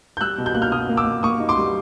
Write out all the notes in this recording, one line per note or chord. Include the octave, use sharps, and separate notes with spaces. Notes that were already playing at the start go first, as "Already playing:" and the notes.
G6
G3 E6 F#6
B2
G6
A#3 F#6
F6 G6
B2 D#6 F6
A#3
D6 E6
A#3
A#3 C#6 D#6
D#4
C6 D6
G3